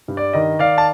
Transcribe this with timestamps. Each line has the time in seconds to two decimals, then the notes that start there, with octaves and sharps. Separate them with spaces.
0.08 G2
0.17 D5
0.33 D#3 D#5
0.59 D#3 D5 F5
0.78 A5